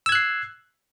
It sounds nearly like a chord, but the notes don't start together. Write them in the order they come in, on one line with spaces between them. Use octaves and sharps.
E6 G#6 F#6 C7